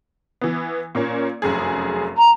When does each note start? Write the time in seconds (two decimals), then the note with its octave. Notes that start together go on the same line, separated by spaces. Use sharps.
0.41 E3 B3
0.95 A#2 A#3 C#4
1.42 F1 F#2 G#4
2.17 A#5